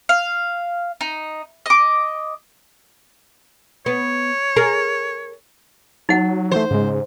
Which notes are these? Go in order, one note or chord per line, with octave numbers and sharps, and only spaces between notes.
F5
D#4
D#5 D6
B3 C#5
G#4 A#4
F#3 D#4 F#5
E3 A3 C5
G#2 C#3 G#3